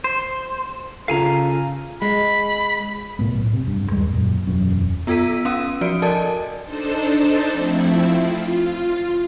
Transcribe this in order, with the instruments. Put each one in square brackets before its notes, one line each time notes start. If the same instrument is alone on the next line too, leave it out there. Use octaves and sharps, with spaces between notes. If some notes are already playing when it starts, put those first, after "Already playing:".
[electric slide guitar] C5
[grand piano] C#3 F4 A4 [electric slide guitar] F5 G#5 A#5
[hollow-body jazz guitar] G#3 [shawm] B5
[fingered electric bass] B1 A2 A3 B3
C3
G2
D#2 G3 G#3
F#2 A#2
E1 F#2 F#3 C#4
[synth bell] B3 F4 A4 E6 B6 D#7
C#4 F5 D#6 E6 D#7
F3 F#4 D5 D7
A4 A#4 D5 D#5 G#5 A5
[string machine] D4 D#4 A4 C5 A5
F3 A3 C4 E4
F4